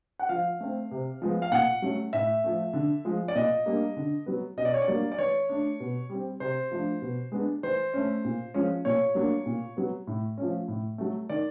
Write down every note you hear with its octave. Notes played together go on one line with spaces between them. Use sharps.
F#5
F3 F5
A3 C4
C3
F3 G#3 B3
F5
A#2 F#5
F#3 A3 C#4
A2 E5
F3 A3
D3
F3 G#3
D5
A#2 D#5
G3 A#3 D4
D3
F#3 B3
B2 D#5
D5
C#5
D5
F#3 A#3 D4
D5
E3 C#5
A3 D4
B2
G3 C4
C3 C5
F3 A3 D4
B2
G#3 B3 D4
E3 C5
A3 C#4
A#2
F3 G#3 C#4
A#2 C#5
F#3 A#3 D4
A#2
F#3 B3
A2
F3 A3 C#4
A2
F#3 A3
D#3 D5